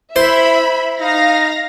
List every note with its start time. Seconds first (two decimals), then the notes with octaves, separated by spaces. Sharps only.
0.16 E4 C5 E5 B5
1.01 D#4 F5 A#6